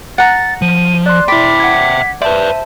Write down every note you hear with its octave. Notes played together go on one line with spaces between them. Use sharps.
F#5 A#5 A6
F3 D#7
D5 C6 F#6
E4 D5 E5 G5 B5 B6
F#5 G#6
B4 C5 D5 E5 A5